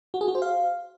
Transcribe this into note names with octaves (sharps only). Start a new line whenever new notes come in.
F#4
G#4
F#4
C5
F5